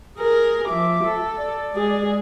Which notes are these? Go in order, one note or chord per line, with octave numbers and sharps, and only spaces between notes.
G#4 A#4
F3 E5 D6
A4
D5
G#3 G#4